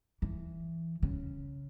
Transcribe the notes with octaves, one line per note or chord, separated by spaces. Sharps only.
E3
C#3